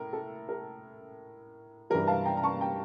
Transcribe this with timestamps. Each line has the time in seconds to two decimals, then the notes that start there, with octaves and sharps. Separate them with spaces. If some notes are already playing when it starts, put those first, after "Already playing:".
Already playing: A2 A#4
0.13 A4
0.49 A#4
1.90 G2 E3 G3 A#4
2.07 F5 A5
2.25 G5 A#5
2.37 A#5
2.43 A5 C#6
2.61 G5 A#5